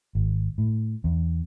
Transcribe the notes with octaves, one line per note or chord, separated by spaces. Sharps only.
G#1
A2
E2